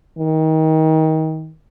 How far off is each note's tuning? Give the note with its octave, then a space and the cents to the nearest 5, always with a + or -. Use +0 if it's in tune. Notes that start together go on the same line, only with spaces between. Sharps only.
D#3 +25